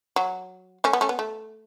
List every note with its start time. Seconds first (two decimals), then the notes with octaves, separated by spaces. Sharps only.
0.16 F#3
0.84 A3 C#4
0.93 B3
1.01 A3 C#4
1.09 B3
1.19 A3